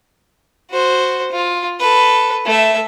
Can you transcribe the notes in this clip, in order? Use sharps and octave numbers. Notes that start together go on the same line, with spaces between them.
F#4 C5
F4
A4 B4
A3 E5